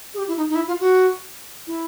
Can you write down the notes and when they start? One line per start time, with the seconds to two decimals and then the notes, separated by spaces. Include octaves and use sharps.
0.14 G#4
0.18 G4
0.28 E4
0.37 D#4
0.49 D#4
0.55 E4
0.67 F4
0.80 F#4
1.67 E4